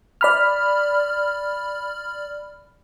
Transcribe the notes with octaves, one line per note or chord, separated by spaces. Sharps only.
D5 B5 F6